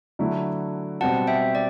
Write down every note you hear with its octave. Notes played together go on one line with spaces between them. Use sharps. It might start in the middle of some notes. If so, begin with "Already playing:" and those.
D3 F#3 A3 E4
B2 G3 C4 F#4 F#5 A5
E5 G5
D5